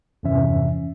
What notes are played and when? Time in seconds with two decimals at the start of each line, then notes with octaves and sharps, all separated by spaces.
0.23 E2 G2 C3 E3 C#4 E5